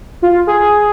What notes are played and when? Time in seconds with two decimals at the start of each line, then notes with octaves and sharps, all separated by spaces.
0.22 F4
0.47 G#4